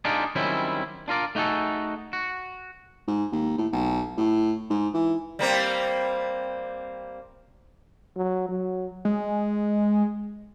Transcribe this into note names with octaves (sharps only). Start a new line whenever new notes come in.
D4 D#4 F4 G4 G#4 D5
D#3 F#3 G3 C4 C#4 E4
D4 F4 A#4 D5
A3 D#4 F#4 G#4 A4
F#4
G#2
D#2
A2
B1
A2
G#2
E3
G3 A#3 C4
F#3
F#3
G#3